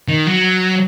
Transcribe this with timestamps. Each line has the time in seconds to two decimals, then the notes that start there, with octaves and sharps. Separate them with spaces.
0.08 D#3
0.27 F#3